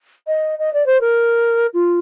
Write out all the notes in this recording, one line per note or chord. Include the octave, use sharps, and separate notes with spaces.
D#5
D#5
D5
C5
A#4
F4